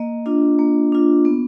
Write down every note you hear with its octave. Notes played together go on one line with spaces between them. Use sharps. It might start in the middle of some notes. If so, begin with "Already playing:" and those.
Already playing: A#3 D#5
D4 F4
A#3
D4 F4
B3